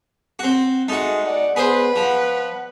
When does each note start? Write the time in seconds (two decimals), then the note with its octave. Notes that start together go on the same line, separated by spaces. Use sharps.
0.39 C4 F#4
0.89 G#3 A3 D#4 F#4
1.27 D5 F#5
1.56 B3 G#4 B4 C5
1.96 F3 F#5